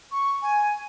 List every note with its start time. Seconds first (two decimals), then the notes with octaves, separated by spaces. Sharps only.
0.12 C#6
0.42 G#5